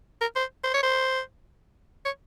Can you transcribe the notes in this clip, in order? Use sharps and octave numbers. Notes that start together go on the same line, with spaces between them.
A#4
C5
C5
C#5
C5
C#5